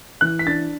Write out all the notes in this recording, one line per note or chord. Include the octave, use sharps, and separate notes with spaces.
E3 F#6
B6
D4 A6